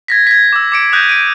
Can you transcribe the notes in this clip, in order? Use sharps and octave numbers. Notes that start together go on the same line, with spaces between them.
G#6 A#6 B6
G#6 A#6 B6
D6 E6
D6 C#7 D7
D#6 F#6 G6 A#6 D#7
D7 D#7